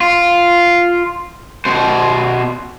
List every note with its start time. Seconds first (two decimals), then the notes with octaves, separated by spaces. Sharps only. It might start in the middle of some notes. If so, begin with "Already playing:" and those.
0.01 F4
1.65 B2 C5